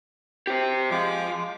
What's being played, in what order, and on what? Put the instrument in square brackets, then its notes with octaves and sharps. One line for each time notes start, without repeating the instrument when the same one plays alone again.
[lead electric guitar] G4 C5
[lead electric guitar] F3 [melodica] G#3 D6